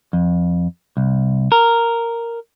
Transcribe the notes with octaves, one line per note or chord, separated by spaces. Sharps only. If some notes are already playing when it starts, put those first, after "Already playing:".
F2
C2
A#4